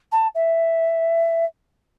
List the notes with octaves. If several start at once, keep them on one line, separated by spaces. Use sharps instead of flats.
A5
E5